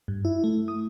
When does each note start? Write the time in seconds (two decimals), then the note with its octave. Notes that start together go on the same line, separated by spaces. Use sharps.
0.08 G2
0.25 E4
0.44 A3
0.68 D#6